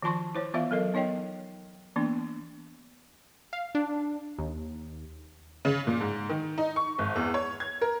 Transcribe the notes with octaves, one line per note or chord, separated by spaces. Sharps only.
D#3 F3 F4 A5 C6 C#6
E4 C5 C#5
E3 B3 F4 E5 F5
F#3 A4 A#4 D#5
B3 D#4 C#5 D#5 G5
E3 A#3 B3 D4
F5
D4
D#2
C#3
A#2
G#2
D#3
D#4
C#6
G#1
E2
C#5
G#6
A#4